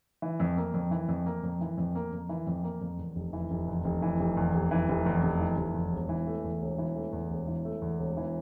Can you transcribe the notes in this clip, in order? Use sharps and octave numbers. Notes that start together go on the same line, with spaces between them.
E3
F2
A#3
F2
E3
F2
A#3
F2
E3
F2
A#3
F2
E3
F2
A#3
F2
E2
F1
E3
F1
E2
F1
E3
F1
E2
F1
E3
F1
E2
F1
E3
F1
E2
E1
E3
A3
E2
E1
E3
A3
E2
E1
E3
A3
E2
E1
E3